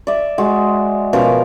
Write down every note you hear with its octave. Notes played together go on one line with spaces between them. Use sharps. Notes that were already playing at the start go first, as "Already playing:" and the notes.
D5 E5
G#3 F#4
B2 F3 C#4 A#4